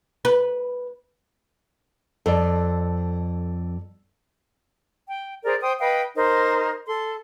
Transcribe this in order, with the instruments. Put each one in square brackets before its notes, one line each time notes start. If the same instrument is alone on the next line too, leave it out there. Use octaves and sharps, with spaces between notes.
[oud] B4
[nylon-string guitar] F2 [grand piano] A4 D5
[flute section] G5
G#4 A#4 C5 D5
C5 G5 C6 D#6
B4 D#5 F5 G5
D#4 A#4 C5
A4 C6